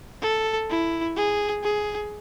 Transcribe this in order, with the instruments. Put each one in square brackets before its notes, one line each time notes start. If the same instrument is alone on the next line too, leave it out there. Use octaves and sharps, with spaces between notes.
[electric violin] A4
E4
G#4
G#4